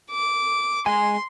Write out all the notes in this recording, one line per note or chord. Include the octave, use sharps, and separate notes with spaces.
D6
G#3 G#5 C6